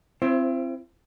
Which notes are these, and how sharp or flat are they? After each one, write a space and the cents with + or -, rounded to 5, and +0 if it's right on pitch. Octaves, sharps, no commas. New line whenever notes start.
C4 +0 E4 +40 C5 +25